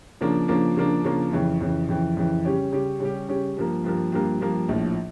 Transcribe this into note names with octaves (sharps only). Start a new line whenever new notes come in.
C#3 F3 A#3 D4
C#3 F3 A#3 D4
C#3 F3 A#3 D4
C#3 F3 A#3 D4
F2 C#3 E3
F2 C#3 E3
F2 C#3 E3
F2 C#3 E3
C#3 G3 C#4 G4
C#3 G3 C#4 G4
C#3 G3 C#4 G4
C#3 G3 C#4 G4
G2 F3 A#3
G2 F3 A#3
G2 F3 A#3
G2 F3 A#3
A#1 A2 F3